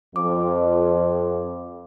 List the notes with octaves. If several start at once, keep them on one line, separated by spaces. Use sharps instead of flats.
F2 D6